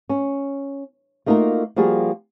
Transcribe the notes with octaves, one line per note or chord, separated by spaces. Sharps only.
C#4
A3 A#3 D#4 F4 F#4 A#4
F3 G3 A#3 F#4 G#4 A#4